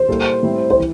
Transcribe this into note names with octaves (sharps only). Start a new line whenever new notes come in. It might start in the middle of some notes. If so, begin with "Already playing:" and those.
Already playing: C5
A#2 G3 A#3 E4 A4
A2 G3 C4 E4
C5
E3